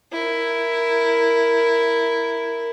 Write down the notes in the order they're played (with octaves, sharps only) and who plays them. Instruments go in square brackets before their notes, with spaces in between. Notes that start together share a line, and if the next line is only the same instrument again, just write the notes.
[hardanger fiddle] E4 A#4